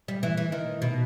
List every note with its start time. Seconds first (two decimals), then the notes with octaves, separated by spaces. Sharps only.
0.08 G3
0.23 E3
0.37 E3
0.52 D#3
0.82 B2